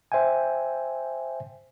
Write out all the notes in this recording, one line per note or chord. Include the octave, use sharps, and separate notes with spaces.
C5 E5 G5 G#5